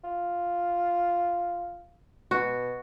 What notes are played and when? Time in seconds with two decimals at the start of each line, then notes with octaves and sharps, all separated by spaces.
0.04 F4
2.31 B2 F#4